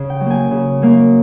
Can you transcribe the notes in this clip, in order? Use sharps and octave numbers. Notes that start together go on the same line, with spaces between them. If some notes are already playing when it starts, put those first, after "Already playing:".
Already playing: C#3
G5
F#3 A#3
G#5
C#3
F#3 A#3